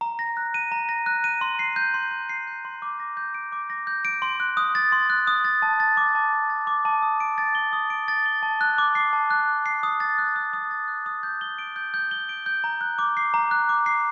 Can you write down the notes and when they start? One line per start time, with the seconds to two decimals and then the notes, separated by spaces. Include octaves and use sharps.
0.01 A#5
0.19 A#6
0.37 F#6
0.54 D#7
0.72 A#5
0.89 A#6
1.06 F#6
1.24 D#7
1.41 C6
1.59 C7
1.76 G6
1.94 C6
2.11 C6
2.29 C7
2.47 G6
2.65 C6
2.82 D6
3.00 A#6
3.17 G6
3.34 D7
3.52 D6
3.70 A#6
3.87 G6
4.05 D7
4.22 C6
4.40 F#6
4.57 D#6
4.75 A6
4.92 C6
5.10 F#6
5.27 D#6
5.44 A6
5.62 A5
5.80 A6
5.97 D6
6.15 A5
6.33 A5
6.50 A6
6.67 D6
6.85 A5
7.03 D#6
7.20 D7
7.38 A6
7.55 G7
7.73 D#6
7.90 D7
8.08 A6
8.26 G7
8.43 A5
8.61 F#6
8.78 D6
8.95 C7
9.13 A5
9.31 F#6
9.49 D6
9.66 C7
9.83 D#6
10.00 A6
10.18 F#6
10.36 D#6
10.53 D#6
10.71 A6
10.88 F#6
11.06 D#6
11.23 G6
11.41 G7
11.59 D7
11.76 G6
11.94 G6
12.11 G7
12.29 D7
12.46 G6
12.64 A#5
12.81 F#6
12.99 D6
13.17 C7
13.34 A#5
13.51 F#6
13.69 D6
13.86 C7